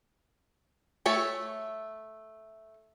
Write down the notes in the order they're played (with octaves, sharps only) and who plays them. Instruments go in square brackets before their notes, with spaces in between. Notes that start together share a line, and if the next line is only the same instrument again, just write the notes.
[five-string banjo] A3 C#5 E5 A5